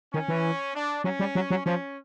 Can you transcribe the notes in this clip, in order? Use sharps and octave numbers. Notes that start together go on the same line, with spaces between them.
D#3 C#4
E3
D4
F#3 C#4
G3
F#3
F#3
F3 C#4